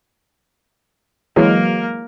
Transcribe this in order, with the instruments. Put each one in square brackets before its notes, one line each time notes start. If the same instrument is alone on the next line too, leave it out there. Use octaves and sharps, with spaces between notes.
[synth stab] E3 F#3 G#3 [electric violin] A#3 A#4